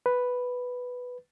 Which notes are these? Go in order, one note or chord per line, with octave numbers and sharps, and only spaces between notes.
B4